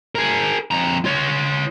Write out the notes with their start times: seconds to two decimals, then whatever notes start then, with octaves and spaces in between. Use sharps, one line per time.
0.15 G#4 A#4
0.71 F2 A#5
1.05 F4 C#5